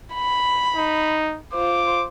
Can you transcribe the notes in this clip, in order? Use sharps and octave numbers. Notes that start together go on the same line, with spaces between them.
B5
D#4
F4 C5 D6